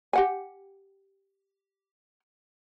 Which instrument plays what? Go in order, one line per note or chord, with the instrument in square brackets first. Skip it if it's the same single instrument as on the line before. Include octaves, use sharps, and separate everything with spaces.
[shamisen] G4 F#5 G#5